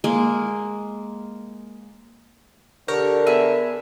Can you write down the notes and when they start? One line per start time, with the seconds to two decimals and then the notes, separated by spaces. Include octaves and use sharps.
0.04 G#3 A#3
2.88 D3 G4 A#4 C#5
3.27 B3 G#4 B4 E5